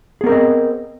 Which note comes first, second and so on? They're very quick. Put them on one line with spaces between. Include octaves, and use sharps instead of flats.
G#4 B3 A#4 C4 D#5